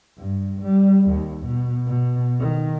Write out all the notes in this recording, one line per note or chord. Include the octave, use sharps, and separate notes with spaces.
G2
G3
D#2
B2
B2
D#3